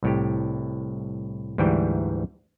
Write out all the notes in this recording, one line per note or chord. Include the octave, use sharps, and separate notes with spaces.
C2 A2 G4
D2 G#2 E3 G3 G5